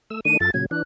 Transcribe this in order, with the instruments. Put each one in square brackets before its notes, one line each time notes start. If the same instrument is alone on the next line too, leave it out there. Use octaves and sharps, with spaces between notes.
[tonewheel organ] A3 E6
[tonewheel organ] D#3 A3 D4 [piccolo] D#7
[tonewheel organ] F#2 F4 A4 [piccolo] A6
[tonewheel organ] A#2 C#3 F#3 [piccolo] G#6
[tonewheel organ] E3 D4 [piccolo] F#6